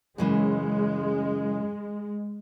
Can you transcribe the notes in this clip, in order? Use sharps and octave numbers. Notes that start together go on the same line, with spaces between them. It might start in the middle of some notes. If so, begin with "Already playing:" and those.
F#2 C#3 E3 G#3